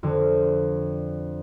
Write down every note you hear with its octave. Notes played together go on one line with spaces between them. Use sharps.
F2 D3